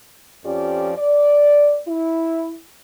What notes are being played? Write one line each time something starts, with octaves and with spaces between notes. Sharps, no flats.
F2 F3 C#4 G4 D5
D5
E4